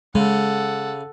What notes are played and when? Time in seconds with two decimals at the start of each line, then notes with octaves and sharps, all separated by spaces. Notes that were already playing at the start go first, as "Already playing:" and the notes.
0.15 C#3 G#3 A4 F#5